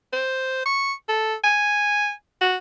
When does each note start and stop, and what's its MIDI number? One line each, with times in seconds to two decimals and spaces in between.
0.13 0.63 72
0.65 0.93 85
1.09 1.35 69
1.44 2.11 80
2.41 2.56 66